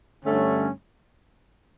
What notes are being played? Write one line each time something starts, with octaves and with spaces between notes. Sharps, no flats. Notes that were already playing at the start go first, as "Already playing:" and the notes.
G2 D3 A3 C#4